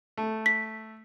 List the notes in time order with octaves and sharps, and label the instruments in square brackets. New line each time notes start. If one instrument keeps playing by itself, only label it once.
[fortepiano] A3
[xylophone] B6